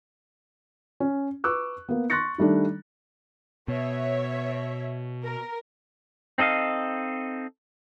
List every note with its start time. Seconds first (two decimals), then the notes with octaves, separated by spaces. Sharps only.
1.00 C#4
1.44 B4 C#6 D6 E6 F#6
1.89 A#3 B3
2.10 C6 C#6 F#6 A6 A#6 C#7
2.38 D#3 G3 A3 D4
3.68 B2 C#5 E5
5.24 A#4
6.38 C4 D#4 A4 D#5 F5